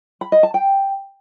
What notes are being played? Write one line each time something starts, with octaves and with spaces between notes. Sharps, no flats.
B5
D#5
A5
G5